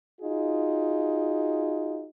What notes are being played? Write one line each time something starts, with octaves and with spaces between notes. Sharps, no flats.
D#4 F4 F#4 G#4